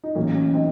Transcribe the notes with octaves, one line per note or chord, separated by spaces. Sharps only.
D#4
A1 A2 F#3 A#3 C#4
C#4
C4 D#4